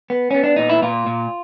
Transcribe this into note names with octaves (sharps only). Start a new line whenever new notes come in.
B3
B3 C#4
D4
A#2 D#4
E4
A#2 F4
A#2